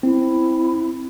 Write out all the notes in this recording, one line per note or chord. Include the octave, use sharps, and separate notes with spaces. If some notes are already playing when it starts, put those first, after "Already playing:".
C4 E4